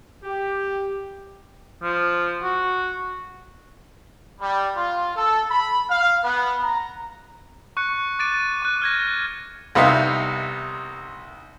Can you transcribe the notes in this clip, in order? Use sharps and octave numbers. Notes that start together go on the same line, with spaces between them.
G4
F3
F#4
G3
F4
A4
B5
F5
B3
A#5
C#6 F#6 C#7
D6 A6 D7 D#7
C#6 F#6
F6 G#6 A#6
F#6
C2 C3 B3 D#4 E5 F5